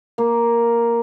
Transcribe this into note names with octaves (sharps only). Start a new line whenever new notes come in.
A#3